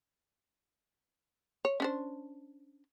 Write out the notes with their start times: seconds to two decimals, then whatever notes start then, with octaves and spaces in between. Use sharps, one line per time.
1.65 C#5
1.80 C#4 D4 C5